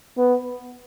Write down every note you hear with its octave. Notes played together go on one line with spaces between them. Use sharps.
B3